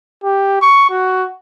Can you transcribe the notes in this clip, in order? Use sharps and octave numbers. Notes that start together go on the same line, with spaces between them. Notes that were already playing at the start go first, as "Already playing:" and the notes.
G4
C#6
F#4